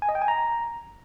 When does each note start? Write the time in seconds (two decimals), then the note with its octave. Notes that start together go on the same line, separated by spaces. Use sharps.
0.02 G#5
0.09 D#5
0.15 G5
0.22 G#5
0.28 A#5